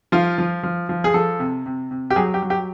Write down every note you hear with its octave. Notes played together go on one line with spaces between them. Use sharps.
F3 F4
F3
F3
F3
G#4
F3 A4
C3
C3
C3
G4
F#3 G#4
G4
F#3
G4